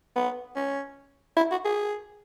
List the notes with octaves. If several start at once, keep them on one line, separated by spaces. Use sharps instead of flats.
B3
C#4
E4
F#4
G#4